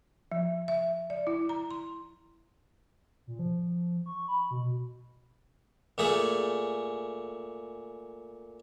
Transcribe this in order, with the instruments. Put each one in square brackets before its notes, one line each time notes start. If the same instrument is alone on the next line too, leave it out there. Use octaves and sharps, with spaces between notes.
[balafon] F3
E5
D5
E4
A#5
C6
[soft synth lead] A#2
F3
C#6
B5
B2
[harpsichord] A#2 A3 G#4